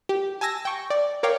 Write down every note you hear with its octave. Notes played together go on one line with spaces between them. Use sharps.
G4
G#5 A5 E6 A#6
G5 C#6
D5
A#4 C#5 D5 F5 G5